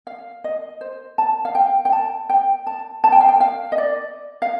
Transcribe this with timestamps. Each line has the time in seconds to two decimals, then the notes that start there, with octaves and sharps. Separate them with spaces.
0.07 F5
0.44 D#5
0.81 C5
1.18 A5
1.45 F5
1.55 G5
1.85 G5
1.92 A5
2.30 G5
2.67 A5
3.04 A5
3.12 G5
3.21 F5
3.29 G5
3.40 F5
3.72 D#5
3.78 D5
4.42 F5